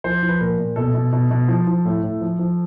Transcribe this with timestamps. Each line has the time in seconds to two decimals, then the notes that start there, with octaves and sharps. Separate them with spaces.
0.04 F3 C5
0.23 F3
0.29 B4
0.40 A#2 A#4
0.58 A#2
0.76 B2 A4
0.94 B2
1.13 B2
1.31 B2
1.48 F3
1.67 F3
1.85 A2
2.03 A2
2.21 F3
2.39 F3